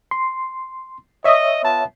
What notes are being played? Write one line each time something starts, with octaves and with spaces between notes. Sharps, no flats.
C6
C#5 D#5 E5
B3 F4 A5